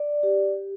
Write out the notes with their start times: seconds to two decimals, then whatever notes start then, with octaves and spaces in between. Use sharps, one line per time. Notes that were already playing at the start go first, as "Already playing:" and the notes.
Already playing: D5
0.23 G4